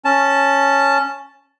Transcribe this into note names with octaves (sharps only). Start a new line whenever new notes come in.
C#4 A5